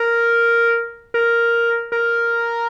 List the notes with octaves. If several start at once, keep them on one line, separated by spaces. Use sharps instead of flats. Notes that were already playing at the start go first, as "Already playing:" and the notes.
Already playing: A#4
A#4
A#4